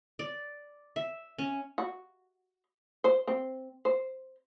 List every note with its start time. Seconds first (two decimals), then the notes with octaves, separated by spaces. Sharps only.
0.19 D5
0.96 E5
1.38 C#4
1.78 F#4
3.04 C5
3.28 C4
3.85 C5